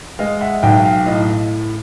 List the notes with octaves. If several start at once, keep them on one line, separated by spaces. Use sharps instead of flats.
G#3 D#5 F5
E5 F#5
B1 F5 G5
F5 G5
A2 D#5 F5